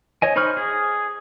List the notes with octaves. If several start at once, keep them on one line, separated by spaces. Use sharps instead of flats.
C#5 D#5 G#5
D#4 C5 B5 C#6 F6
G#4